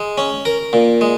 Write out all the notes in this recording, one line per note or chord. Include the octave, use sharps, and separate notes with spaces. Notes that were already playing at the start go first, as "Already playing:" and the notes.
Already playing: G#3
C#4
A#4
A#2
G#3